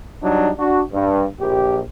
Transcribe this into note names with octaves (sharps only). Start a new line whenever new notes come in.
F#3 G3 D4 D#4
D4 F#4
G2
A#1 G4